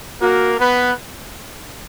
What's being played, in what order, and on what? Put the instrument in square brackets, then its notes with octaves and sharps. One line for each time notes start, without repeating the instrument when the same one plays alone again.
[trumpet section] A#3 A#4 [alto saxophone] F#4
[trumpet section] B3 B4